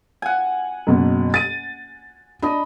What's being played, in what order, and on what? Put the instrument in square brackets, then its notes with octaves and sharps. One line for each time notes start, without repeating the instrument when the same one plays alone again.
[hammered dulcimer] F#5 G#5
[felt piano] F#1 B2
A6 D#7
[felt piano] D4 [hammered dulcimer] D#5 B5